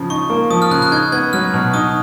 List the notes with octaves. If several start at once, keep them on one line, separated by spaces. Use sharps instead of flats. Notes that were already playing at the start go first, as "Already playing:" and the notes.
Already playing: C#3 F3
D#4 C#6
A#3
F3 D#6
F6
C#3 F#6
F#6
D#4 G#6
B3 G#6
F#3 F6
B2
D#4 D#6